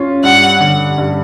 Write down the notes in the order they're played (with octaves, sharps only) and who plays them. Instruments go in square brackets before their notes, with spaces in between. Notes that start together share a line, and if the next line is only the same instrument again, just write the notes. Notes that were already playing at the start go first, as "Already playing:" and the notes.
Already playing: [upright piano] C#4 F4
[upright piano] G2 [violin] F#5
[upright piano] D3
G2